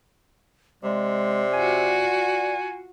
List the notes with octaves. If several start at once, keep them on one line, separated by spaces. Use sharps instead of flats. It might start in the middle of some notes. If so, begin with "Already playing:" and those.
C3 G#3 D5
F4 F#4 G#5